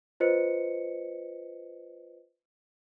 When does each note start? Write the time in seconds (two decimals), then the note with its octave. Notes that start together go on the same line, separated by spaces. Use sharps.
0.20 F4 B4 C5 D#5 C#7